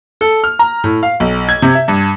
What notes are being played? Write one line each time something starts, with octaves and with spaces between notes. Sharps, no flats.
A4
F6
A#5
A2
F5
B1
G#6
C3
E5
G2